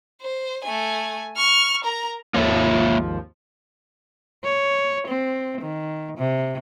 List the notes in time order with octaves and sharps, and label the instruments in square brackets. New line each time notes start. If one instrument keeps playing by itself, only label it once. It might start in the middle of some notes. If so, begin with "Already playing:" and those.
[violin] C5
A3 G#5
C#6 F6
A#4 A#5
[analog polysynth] G#1 D#2 F3 [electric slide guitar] A#3 C#5 E5
[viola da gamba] C#5
C4
D#3
C3